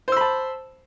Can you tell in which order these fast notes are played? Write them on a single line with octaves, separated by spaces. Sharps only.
C5 E6 B5 A5